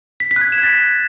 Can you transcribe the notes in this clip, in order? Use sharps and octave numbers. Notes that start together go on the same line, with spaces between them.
B6
B6
F#6
G#6
E7
G#6
A6